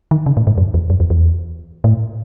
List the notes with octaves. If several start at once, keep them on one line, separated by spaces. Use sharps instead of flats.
D#3
C#3
A2
G#2
F#2
E2
F#2
E2
E2
A2